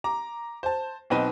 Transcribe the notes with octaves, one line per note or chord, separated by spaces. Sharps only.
A#5 D6
C5 A5
B1 B2 C4 D#4 B4 D#7